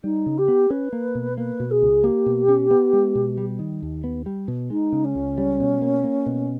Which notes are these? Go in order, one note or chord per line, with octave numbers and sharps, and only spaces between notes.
G3 D#4
C#3
G4
B3
C#4 B4
A#3
B2
A#3 B4
B2
G#4
C#2
A#3 G4
B2
C#4
B3
G#3
B2
G3
D#3
D#2
B3
G3
B2
G#3 D#4
C#3
C#4
C#2
G3
B2
A#3
A#3
B2